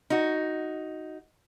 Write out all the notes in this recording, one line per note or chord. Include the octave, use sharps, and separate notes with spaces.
D#4 F#4